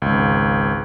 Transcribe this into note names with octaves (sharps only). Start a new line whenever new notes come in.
G#1 C#2